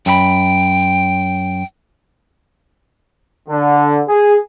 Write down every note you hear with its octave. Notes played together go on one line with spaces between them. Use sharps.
F#2 A4 G5 B5
D3
G#4